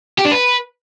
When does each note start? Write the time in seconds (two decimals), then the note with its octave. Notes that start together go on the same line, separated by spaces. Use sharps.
0.19 G4
0.25 D4
0.32 B4